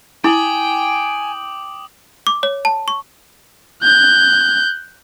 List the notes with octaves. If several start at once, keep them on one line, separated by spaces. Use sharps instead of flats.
E4 G5 G#5 D6 D#6 F#7
D6
C#5
A5
C#6
F#6 G6